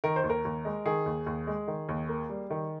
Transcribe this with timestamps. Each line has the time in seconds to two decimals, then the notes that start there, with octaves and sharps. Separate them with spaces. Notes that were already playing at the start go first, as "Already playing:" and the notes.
0.04 D#3 A#4
0.16 C5
0.24 D#2
0.30 A#4
0.45 D#2
0.65 G#3
0.85 D#3 G#4
1.06 D#2
1.26 D#2
1.47 G#3
1.68 D#3
1.89 D#2
2.09 A#3
2.29 G3
2.50 D#3